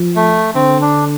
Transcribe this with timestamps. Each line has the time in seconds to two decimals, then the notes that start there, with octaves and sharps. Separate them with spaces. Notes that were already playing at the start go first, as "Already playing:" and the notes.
Already playing: F3
0.16 A3
0.54 D3 C4
0.81 D4